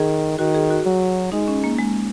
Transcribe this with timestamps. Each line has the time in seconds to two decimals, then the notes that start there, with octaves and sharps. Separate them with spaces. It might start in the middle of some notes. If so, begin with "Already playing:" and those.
Already playing: D#3 G#4
0.39 D#3 F#4
0.54 G#4
0.70 F#4
0.86 F#3
1.32 G#3 D#4
1.48 C#4
1.64 A#3
1.79 G#3